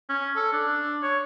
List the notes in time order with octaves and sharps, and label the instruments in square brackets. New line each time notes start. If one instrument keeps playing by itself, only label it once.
[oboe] C#4
A4
D4
C#5